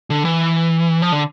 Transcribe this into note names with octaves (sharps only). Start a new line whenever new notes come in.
D3
E3
F3
D3